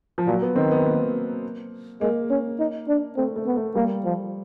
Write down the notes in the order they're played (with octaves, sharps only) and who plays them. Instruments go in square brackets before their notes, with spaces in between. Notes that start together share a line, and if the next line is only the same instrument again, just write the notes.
[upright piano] F3
[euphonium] A#2 [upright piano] F#3
[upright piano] B3
[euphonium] D#3 [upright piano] C4
[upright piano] B3
A#3
[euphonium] G#3 [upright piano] A#3
[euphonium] C#4
D#4
D4
[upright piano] A3 [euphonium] C4
[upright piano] A3
[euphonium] B3
[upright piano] A3
[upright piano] G3 [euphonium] A#3
[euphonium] F3